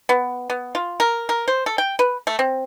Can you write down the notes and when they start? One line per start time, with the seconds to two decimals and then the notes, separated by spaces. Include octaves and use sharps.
0.09 B3
0.50 B3
0.75 F4
1.00 A#4
1.29 A#4
1.48 C5
1.66 A4
1.78 G5
1.99 B4
2.27 A3
2.39 C4